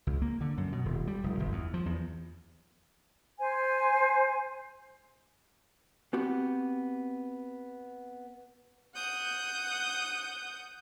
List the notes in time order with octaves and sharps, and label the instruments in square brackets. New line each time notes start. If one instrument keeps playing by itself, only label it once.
[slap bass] C#2
A#3
D3
F#2
B2
D#1
G3
F1
G1
E2
F3
E2
[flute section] C5 G#5
[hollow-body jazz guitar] B3 C4 F#4 G4
[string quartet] F#5 D#6 G6